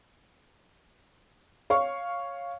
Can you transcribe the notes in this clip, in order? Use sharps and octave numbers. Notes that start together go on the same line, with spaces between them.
C#5 F5 C#6